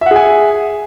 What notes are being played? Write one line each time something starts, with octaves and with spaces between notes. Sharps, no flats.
G#4 E5 F#5 G#5